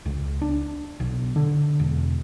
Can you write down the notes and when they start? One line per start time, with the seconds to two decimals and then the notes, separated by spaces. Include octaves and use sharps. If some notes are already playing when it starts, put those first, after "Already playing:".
0.06 C#2
0.42 D4
1.00 B1
1.36 D3
1.80 E1